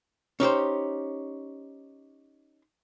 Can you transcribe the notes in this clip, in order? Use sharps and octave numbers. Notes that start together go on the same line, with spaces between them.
C#4 D#4 G4 C5